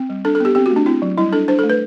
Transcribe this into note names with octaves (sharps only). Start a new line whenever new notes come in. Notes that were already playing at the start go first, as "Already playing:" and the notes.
Already playing: C4
G3
D4 A4
A4
B3 G4
C4 G4
F#4
A3
D4
C4 E4
F#3
G3 E4
D4 A4
D4 C5
A4
A3
B4